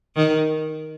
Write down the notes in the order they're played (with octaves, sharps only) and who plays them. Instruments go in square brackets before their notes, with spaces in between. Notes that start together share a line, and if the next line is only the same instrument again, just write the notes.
[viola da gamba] D#3